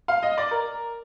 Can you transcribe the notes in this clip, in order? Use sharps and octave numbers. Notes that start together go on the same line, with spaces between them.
F5
D#5
D5
A#4